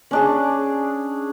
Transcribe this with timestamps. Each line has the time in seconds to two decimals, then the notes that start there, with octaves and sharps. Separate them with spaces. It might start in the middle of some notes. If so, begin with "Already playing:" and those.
0.11 C#4 D4 G#4